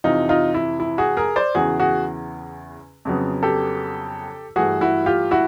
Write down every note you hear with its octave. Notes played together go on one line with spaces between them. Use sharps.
F2 C3 E3 D#4 F4
D#4 F4
E4
E4
F#4 G#4
G#4 A#4
C5 D5
E2 C#3 E3 F#4 G#4
F#4 G#4
F2 C#3 F#3 B3
G4 A4
G2 E3 A3 F#4 G#4
E4 F#4
F4 G4
E4 F#4